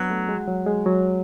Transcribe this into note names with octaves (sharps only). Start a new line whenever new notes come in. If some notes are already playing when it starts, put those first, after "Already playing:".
Already playing: F#3 B3 D4 F#4
A3
G#3
F#3
G#3
F#3